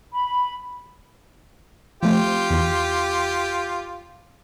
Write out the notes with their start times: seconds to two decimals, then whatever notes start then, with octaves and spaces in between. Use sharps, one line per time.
0.11 B5
2.03 F3 A3 C4 F4 G4
2.50 E2